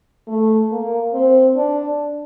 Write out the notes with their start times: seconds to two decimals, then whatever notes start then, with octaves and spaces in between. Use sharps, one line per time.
0.28 A3
0.71 A#3
1.14 C4
1.56 D4